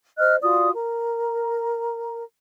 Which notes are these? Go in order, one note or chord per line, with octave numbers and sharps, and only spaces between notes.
C5 D#5 F6 F#6
F4 F#4 D5 D#6
A#4 A#5